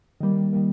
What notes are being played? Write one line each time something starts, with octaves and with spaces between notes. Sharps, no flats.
D#3 G3 A#3
D#3 G3 A#3